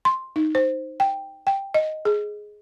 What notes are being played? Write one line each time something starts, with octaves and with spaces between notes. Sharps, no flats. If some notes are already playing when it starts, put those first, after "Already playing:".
C6
D#4
C5
G5
G5
D#5
G#4